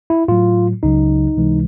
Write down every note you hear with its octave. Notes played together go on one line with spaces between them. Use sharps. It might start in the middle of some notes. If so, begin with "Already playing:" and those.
E4
A2 F#3 F4
C#2 C#3 F#3 D#4
C#2 C3 E3 G#3